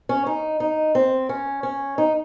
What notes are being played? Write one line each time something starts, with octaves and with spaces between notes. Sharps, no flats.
C#4
D#4
D#4
C4
C#4
C#4
D#4